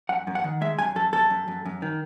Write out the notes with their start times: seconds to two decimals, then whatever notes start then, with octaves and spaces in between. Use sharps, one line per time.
0.09 F#2 F#5
0.27 F#2
0.35 F#5
0.44 D#3
0.61 G#3 E5
0.79 F#2 G#5
0.96 F#2 A4
1.13 F#2 A4
1.30 F#2
1.48 F#2
1.65 F#2
1.82 D#3